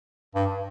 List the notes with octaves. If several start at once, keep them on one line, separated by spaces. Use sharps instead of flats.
G2